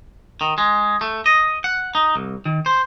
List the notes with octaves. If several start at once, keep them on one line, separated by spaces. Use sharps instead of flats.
D#3
G#3
A3
D#5
F#5
D#4
C2
D#3
C5